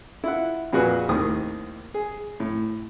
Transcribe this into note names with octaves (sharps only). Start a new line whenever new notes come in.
E4 F4 F#5
F2 A#2 A#3 F#4 G#4 B4
D#2 A2 D#3 C4 D#6
G#4
A2